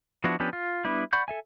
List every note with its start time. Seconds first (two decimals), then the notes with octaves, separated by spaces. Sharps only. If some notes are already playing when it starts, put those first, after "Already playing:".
0.24 F3 B3 D4 E4 F#4
0.40 F3 B3 C#4 D4 G4
0.53 F4
0.85 G3 B3 D4 E4
1.13 D5 F#5 B5 C#6 G6
1.28 A4 E5 G#5